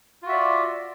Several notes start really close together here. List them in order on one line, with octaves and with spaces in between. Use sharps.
F4 F#4 E5 D5